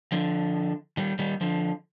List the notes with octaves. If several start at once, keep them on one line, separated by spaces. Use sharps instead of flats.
D3 F3
D#3 G3
D#3 G3
D3 F3